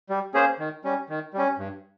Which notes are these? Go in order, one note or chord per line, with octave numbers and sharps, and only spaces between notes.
G3
A#3 C#4 G#4 C5
D#3
G3 C#4
D#3
G3 C#4
G2